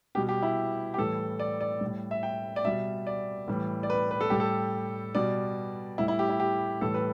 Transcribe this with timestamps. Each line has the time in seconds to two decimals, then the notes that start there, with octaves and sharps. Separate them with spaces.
0.15 B2 G3 G4
0.29 G4
0.42 E4
0.94 G4
0.98 A2 E3 G3 A4
1.39 D5
1.61 D5
1.81 A2 G3
2.11 E5
2.23 G5
2.56 D5
2.65 B2 G3 E5
3.07 D5
3.48 A2 E3 G3
3.83 D5
3.90 B4
4.11 B4
4.21 A4
4.30 A2 G3 G4
4.40 A4
5.15 B2 G3 D5
5.98 A2 G3 E4
6.08 E4
6.19 G4
6.29 E4
6.40 G4
6.81 A2 E3 G3 A4
6.94 B4